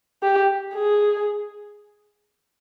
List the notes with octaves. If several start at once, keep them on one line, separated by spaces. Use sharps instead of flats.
G4
G#4